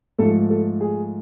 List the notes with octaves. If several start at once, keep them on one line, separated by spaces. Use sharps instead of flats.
G#2 F3 A3 A4
A4
G#4